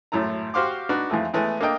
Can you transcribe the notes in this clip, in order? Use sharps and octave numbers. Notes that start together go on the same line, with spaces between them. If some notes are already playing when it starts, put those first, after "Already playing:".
G#1 F#2 A2 A3 A#5
F#4 G4 C5 F5 C6 D6
D4 D#4 F#4 B4
F2 E3 G#3 A3
E3 G#3 A3 B3
A#3 D4 A4 D#5 G5